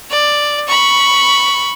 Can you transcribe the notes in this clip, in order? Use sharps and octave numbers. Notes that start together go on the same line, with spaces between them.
D5
B5 C#6